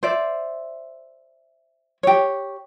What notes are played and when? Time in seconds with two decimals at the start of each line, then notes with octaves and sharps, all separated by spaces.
0.03 C5 D5 E5
2.03 G4 C#5